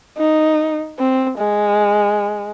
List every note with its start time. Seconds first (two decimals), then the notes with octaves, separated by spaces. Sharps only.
0.18 D#4
0.99 C4
1.39 G#3